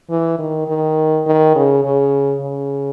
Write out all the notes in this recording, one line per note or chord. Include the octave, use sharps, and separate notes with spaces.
E3
D#3
D#3
D#3
C#3
C#3
C#3